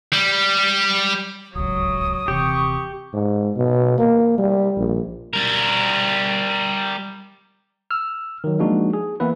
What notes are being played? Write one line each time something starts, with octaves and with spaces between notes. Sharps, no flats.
G3
D1 G#1 C#2 F#3 D#6
D#1 C3 E3 G4 C#6
G#2
B2
A#3
G3
A#1
G3 A#4
E6 F6
D#3 F#3
F3 G#3 A#3 D4 D#4 F#4
G#4
E3 A#3 B3 E4 B4